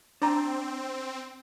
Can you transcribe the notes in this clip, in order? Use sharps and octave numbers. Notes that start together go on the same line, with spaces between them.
C4 D4 A#5